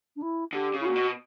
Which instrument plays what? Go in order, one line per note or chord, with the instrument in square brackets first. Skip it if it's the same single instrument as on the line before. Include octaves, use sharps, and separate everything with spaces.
[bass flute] D4
E4
[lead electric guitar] D3 [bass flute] G4
[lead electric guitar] C#3
[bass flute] E4
[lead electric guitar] A#2 [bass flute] F#4
[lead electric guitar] B2